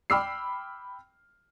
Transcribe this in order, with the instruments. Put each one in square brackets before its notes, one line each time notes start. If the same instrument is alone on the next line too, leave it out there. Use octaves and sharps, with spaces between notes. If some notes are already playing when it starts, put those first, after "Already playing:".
[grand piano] G5 B5 D6 E6 F6 C7